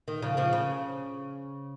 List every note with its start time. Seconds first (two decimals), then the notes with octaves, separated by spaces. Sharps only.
0.08 D#3
0.22 C#3 F3
0.37 C#3 F3
0.53 C#3